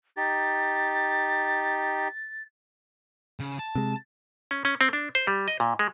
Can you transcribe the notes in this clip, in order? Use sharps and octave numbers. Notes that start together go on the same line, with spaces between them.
D#4 G4 A6
C#3
A5
C3 G#3
C#4
C#4
C4
D4
C5
G3
D#5
A#2
G#3